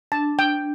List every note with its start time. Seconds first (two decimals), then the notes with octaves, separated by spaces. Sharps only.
0.12 D4 A5
0.39 D4 G5